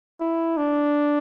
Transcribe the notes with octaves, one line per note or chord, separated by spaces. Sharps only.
E4
D4